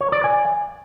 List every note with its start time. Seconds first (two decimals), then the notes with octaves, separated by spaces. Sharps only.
0.01 C#5
0.12 D5
0.24 G#5